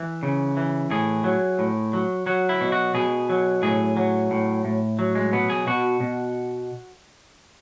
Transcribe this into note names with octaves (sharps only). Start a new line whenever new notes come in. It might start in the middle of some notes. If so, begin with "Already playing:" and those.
Already playing: E3
C#3
E3
A2 G#4
F#3
A2
F#3
F#3 F#4
E4
B2
F#4
B2 G#4
F#3
A2 G#4
F#3
A2
A2
F#3
G#3
B2 B3
G#4
B2 F#4
B2